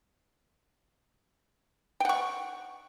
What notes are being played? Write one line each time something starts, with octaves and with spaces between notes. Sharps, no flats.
F#5 G5 C#6